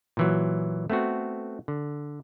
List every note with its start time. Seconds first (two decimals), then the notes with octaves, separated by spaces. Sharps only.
0.17 A#2 E3 F#3
0.90 A3 B3 C4 F#4
1.68 D3